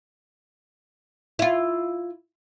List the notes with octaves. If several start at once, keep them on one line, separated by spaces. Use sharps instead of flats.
E4 F4